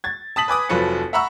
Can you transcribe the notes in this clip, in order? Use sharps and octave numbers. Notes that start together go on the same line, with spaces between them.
G#6 A6
A5 D#6 B6 F#7
B4 G#5 D6 D#6
F1 F3 F#3 B4 C#7
E5 F#5 A#5 B5 C#6 E6